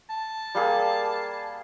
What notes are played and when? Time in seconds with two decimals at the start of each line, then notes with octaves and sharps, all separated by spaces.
0.10 A5
0.55 G3 A#3 G#4